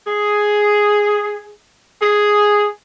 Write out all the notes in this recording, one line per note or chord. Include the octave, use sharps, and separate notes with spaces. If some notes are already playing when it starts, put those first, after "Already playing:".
G#4
G#4